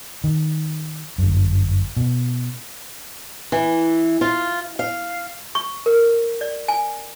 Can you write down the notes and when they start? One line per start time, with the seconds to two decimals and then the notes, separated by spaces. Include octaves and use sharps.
0.24 D#3
1.18 G1 F#2
1.97 B2
3.52 E3
4.21 F4
4.79 F5
5.55 C#6
5.86 A#4
6.41 D5
6.68 G#5